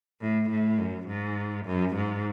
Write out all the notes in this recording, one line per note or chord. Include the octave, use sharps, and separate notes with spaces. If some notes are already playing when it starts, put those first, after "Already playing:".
A2
A2
F#2
G#2
F#2
G#2